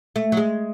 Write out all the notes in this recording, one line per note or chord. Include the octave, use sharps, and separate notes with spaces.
A3
F#3
G#3